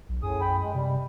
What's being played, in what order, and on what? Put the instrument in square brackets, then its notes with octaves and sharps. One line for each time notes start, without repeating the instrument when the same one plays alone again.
[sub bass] B1
[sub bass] F#2 [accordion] A2 G#4 D#6
[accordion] G5 B5
G#3
[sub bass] C3 [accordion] G3